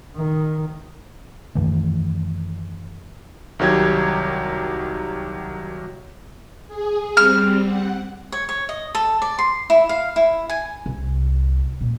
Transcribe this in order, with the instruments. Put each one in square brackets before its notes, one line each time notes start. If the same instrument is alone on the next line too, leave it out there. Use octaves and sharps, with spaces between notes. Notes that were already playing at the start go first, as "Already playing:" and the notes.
[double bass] D#3
[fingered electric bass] F#2 D#3 E3 A3
[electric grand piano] C2 D#3 F#3 G4 G#6
[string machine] G#4
[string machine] G3 C4 [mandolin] F6
[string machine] F#5
[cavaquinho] C#5
C#5
D#5
A4
D5
C6
E4
F5
E4
G#5
[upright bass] C2
A#2